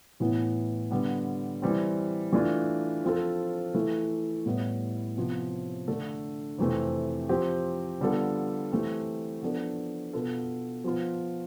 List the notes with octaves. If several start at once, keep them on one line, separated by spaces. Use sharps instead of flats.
A2 E3 B3 E4
D3 G3 B3
E3 G3 C4
E3 A3 D4 F4
F3 C4 F4 A4
E3 A3 E4 A4
A2 G3 B3 E4
C3 F3 B3
D3 A3 D4 A4
F2 C3 E3 A3 C4
F3 C4 G4
D3 G3 B3 F4 A4
E3 A3 C4 G4
F3 B3 D4 A4
B2 B3 F4 A4
F3 B3 F4